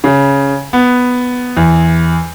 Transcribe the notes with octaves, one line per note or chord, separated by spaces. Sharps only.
C#3
B3
E2